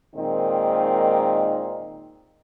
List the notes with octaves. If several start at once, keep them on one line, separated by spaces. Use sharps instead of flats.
A#2 D#3 G#3 C4 D#4